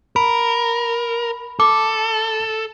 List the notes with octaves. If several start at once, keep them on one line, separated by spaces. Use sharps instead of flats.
A#4 B5
A4 D6